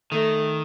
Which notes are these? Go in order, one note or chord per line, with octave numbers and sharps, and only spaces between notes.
D#3 A3